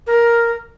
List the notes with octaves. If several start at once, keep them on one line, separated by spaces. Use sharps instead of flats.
A#4